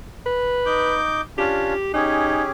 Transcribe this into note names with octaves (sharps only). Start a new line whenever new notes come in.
B4
D#4 D6 G6
C#4 D4 F4 G4
C#4 D#4 G4 G#4